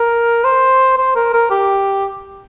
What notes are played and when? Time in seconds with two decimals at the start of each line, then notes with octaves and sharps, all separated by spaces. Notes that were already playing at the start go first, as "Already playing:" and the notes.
Already playing: A#4
0.44 C5
0.98 C5
1.15 A#4
1.34 A#4
1.51 G4